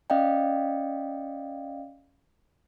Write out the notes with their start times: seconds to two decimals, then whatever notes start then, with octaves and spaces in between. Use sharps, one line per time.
0.10 C#4 D5 D#5 F5 G5